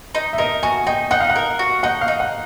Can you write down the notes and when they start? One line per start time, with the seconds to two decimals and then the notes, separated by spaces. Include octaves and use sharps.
0.15 D#4
0.33 E5
0.38 A#4 D#5
0.63 F#4 G#5
0.87 D#4 G5
1.11 D#4 F#5
1.20 F5
1.30 F#5
1.35 A#4
1.59 F#4
1.83 D#4 F#5
2.01 F5
2.08 D#4
2.20 F#5